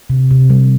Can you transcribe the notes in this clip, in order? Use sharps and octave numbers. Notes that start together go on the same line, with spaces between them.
C3
C3
G3